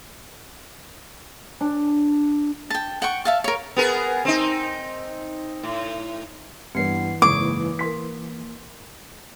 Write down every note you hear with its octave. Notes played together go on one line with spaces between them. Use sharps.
D4
G5 A5
F#5 G5 C#6
E5 F5 A5
A#4 C#5
B3 G#4 A#4
C4 D#4
A2
G2 E3 B3 B4 C7
F#1 G#2 A#3 C#6 D6
A#4 C6 B6